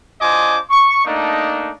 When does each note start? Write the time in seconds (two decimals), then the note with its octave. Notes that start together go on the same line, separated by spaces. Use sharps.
0.21 D4 F4 C5 D#5 G#5 D6
0.70 C#6
1.05 A3 A#3 D4 D#4